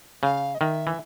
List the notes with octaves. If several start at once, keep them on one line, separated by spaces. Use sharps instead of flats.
C#3 F5
D#5
D#3 E5
E3